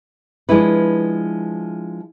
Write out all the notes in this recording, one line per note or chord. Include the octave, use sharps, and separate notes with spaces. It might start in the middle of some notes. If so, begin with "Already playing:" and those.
F3 G#3 D4 E4 B4